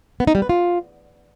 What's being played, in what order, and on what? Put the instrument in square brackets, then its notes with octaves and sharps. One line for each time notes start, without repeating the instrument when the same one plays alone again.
[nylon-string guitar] B3
D#4
G3
B4
F4